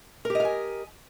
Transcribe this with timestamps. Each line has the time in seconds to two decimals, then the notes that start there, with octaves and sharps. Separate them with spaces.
0.25 A#4
0.30 G4
0.35 D#5
0.40 F5
0.45 G#5